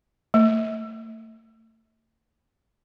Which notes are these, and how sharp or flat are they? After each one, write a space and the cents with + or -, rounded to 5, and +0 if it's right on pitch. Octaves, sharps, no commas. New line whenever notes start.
A3 +35